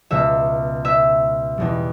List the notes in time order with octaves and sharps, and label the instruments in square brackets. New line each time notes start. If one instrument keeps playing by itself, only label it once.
[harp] C#2 B2 G#3 E5
E5
E2 B2 G3